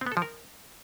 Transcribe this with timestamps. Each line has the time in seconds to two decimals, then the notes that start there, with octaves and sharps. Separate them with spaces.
0.01 C4
0.06 B3
0.12 A4
0.17 F3
0.22 A#4